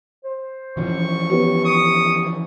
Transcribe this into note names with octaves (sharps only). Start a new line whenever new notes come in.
C5
E3 F3 C#4 C#6
B3 G4 C#5
C#6 D#6